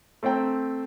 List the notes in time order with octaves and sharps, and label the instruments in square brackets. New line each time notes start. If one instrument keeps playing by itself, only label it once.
[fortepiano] A3 C4 C5 G5 A#5